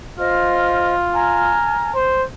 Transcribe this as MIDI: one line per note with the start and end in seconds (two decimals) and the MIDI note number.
0.19 1.56 65
0.19 0.95 72
0.19 0.95 75
0.19 0.95 89
1.13 1.91 80
1.13 1.91 82
1.13 1.91 89
1.95 2.24 72